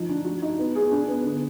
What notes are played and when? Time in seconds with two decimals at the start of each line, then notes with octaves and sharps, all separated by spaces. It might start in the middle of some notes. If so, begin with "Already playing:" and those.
Already playing: F3 D#4
0.09 D4
0.25 F#4
0.42 D#4
0.59 B3
0.75 G#4
0.91 D4
1.08 B3
1.25 D3